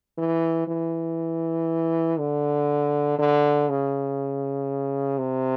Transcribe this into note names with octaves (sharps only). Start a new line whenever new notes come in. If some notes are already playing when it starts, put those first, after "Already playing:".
E3
E3
D3
D3
C#3
C3